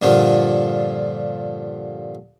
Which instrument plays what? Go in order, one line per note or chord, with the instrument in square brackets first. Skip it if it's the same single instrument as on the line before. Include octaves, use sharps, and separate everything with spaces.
[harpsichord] G2 A#2 D3 F3